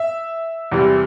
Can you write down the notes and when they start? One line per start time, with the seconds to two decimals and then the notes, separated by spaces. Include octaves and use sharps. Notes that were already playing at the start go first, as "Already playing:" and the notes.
Already playing: E5
0.71 E2 C3 E3 G3